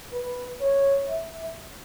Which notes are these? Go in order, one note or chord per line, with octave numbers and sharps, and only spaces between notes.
B4
C#5
E5